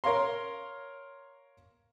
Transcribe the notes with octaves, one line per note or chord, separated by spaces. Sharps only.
A#4 C#5 F5 A#5 C6